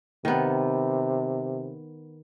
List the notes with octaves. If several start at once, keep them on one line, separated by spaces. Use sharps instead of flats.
C3 D#3 B3